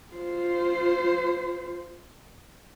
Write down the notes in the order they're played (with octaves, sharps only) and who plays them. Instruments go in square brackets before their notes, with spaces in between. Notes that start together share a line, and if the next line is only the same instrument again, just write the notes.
[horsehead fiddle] F4 C5